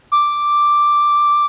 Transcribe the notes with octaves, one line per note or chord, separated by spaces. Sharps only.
D6